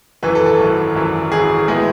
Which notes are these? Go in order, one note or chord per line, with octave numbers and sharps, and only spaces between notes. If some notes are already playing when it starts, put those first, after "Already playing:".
G#1 F#2 E3 B4
A4
A4
G#1 F#2 E3
G#1 F#2 E3
G#1 F#2 E3 G#4
A2 G#3 B3 E4